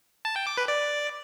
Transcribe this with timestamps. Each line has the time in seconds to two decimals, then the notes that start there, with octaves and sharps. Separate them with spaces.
0.25 A5
0.36 G5
0.47 D6
0.57 B4
0.68 D5